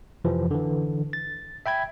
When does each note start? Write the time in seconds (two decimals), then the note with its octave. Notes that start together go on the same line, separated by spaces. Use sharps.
0.25 F2 C3 E3 F3
0.51 D3 E3
1.13 A6
1.66 E5 G5 B5 G#6